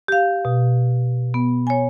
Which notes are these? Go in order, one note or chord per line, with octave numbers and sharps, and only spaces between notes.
G4 F5
B2
B3
C#5 G#5